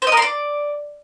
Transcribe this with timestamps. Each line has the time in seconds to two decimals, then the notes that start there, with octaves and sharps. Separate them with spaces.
0.02 C5
0.07 D#5
0.12 A#4
0.17 C6
0.22 D5